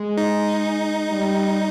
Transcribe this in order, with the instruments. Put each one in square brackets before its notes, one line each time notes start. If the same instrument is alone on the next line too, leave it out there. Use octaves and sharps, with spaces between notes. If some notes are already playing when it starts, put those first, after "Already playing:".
Already playing: [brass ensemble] G#3
[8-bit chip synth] D#4
[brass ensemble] G3